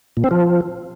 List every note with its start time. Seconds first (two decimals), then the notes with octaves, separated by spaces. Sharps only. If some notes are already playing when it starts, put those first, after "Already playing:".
0.17 A#2
0.24 C4
0.31 F3